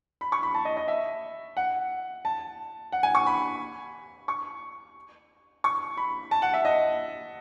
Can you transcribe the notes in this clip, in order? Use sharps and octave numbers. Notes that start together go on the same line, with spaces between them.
B5
C#6
B5
A5
D#5
D#5
E5
F#5
A5
F#5
G#5
C#6
B5
C#6
C#6
B5
A5
F#5
E5
D#5